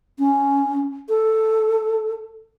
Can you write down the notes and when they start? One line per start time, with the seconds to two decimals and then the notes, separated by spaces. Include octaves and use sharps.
0.19 C#4
1.09 A4